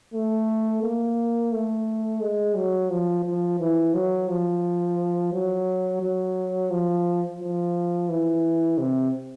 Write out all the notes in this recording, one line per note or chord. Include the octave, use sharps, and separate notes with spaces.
A3
A#3
A3
G#3
F#3
F3
F3
E3
F#3
F3
F#3
F#3
F3
F3
E3
C3